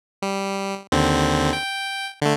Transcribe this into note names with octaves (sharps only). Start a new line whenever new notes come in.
G3
D#2 D3 C4
G5
D3 A3